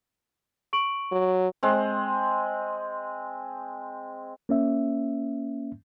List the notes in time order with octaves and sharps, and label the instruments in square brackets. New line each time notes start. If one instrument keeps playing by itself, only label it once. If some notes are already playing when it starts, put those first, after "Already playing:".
[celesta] C#6 D7 F#7
[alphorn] F#3
[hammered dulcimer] G#3 C4
[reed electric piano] A#3 C#4 E5